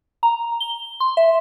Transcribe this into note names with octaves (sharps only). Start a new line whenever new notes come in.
A#5
G7
C6
E5